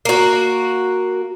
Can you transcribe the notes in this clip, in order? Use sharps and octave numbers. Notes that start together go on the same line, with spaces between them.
A#3 F#4